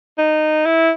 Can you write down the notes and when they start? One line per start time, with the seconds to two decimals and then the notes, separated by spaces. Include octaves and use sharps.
0.18 D#4
0.65 E4